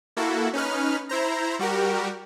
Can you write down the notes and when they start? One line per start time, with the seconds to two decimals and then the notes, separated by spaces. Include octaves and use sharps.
0.17 A#3 E4 F#4 A4
0.53 C#4 D#4 B4 F6
1.09 E4 C5 A#5
1.59 G3 F#4 G4 A#4